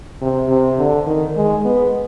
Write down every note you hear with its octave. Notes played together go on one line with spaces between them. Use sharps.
C3
C3
D3
D#3
G#3
B3